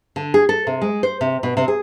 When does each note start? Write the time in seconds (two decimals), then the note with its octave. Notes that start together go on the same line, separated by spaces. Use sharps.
0.16 D3
0.34 G#4
0.49 A4
0.67 C3
0.81 G#3
1.03 C5
1.21 C3
1.43 B2
1.57 C3
1.68 G#4